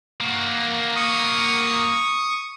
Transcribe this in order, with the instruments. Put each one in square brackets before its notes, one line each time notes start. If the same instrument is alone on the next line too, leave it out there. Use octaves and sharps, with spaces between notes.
[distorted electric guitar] A#3 F#4
[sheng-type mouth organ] C#6 D#6